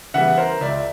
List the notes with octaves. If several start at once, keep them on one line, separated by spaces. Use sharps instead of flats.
C#3 E3 G3 B3 E5 F#5
A#4 C5
C#2 D5 E5